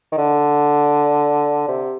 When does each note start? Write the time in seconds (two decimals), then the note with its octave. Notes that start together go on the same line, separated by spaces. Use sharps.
0.12 D#3
0.18 D3
1.68 C3